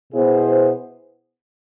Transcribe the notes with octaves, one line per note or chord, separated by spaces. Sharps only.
B2 B3 E4 G#4 C5